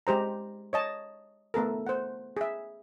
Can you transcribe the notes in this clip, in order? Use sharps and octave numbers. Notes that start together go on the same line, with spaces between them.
G#3 G4 C5 A#5
C#5 D#5 A5
A3 B3 A4 A#4
C5 F#5
G#4 E5